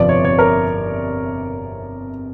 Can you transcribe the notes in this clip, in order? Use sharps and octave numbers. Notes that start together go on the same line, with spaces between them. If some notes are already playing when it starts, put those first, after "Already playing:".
Already playing: G1 F2 C3 F3 D5
C#5
C#5
A#4